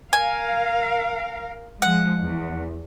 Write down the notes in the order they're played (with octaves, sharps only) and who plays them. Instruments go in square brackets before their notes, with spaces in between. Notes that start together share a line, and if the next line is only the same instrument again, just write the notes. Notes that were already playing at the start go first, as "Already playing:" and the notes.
[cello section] A#4 F5 [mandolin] G#5
[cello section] F3 G#3 [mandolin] F#5
[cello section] E2